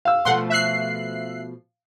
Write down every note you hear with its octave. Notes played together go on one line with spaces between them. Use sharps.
F5 E6
B2 F3 A3 F#5 C6
E5 F#6 C7